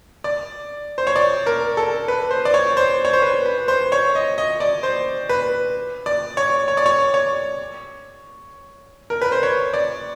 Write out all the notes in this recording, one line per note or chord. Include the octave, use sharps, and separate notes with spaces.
D5
C5
C#5
D5
A#4
A4
B4
C5
D5
C#5
C5
C#5
C5
B4
B4
C5
C#5
D#5
D#5
D5
C5
B4
D5
C#5
C#5
D5
C#5
C#5
A#4
B4
C5
C#5
D5